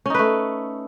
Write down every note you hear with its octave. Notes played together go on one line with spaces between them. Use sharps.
A3 C#4 D#4 B4